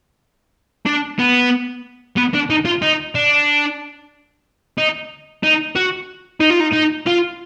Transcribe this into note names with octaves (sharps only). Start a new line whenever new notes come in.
D4
B3
B3
D4
D#4
F4
D#4
D4
D#4
D#4
F#4
D#4
F4
D#4
D#4
F4